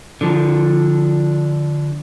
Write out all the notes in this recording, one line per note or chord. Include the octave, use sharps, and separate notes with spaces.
D3 F3